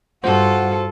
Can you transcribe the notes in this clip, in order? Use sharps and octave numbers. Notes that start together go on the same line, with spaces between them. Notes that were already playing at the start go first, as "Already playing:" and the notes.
G2 F4 F#4 A4 C5 F#5